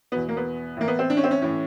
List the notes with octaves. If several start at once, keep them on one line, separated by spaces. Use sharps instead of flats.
E2 B2 B3
A#3
B3
A2 E3 A#3
B3
C4
D4
C#4
C4
C#4
A2 E3 C#4